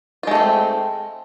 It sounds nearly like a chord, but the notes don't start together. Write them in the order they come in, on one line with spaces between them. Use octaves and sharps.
F4 G#3 A3 C4